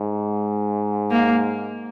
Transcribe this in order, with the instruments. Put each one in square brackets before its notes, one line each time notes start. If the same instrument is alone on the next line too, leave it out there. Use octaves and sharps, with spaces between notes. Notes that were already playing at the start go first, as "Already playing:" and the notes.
Already playing: [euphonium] G#2
[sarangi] A#3